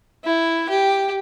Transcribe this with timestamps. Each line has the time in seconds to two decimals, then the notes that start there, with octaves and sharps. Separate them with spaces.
0.24 E4
0.69 G4